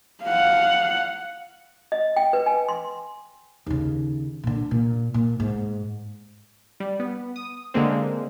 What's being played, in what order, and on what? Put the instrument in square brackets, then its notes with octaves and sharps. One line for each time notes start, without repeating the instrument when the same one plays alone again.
[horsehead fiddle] F5 F#5
[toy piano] D#5
G5
B4
G#5
C6
[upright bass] D#2 C#3
A#2 D3
A#2
A#2
G#2
[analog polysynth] G3
B3
D#6
D3 G#3 A#3 C4